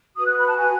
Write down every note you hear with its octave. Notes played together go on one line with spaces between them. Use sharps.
F#4 B4 D#6
F#6
B5
A5
G#5